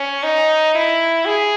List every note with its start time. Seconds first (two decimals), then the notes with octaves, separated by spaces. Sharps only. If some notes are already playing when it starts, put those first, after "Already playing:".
Already playing: C#4
0.23 D#4
0.75 E4
1.26 G#4